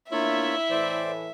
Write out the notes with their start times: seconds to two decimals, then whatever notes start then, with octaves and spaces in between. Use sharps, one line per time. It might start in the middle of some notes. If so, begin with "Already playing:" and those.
0.12 D2 A#3 B3 D4 E4 F4 C#5 E5
0.70 A2 E3 C5 D5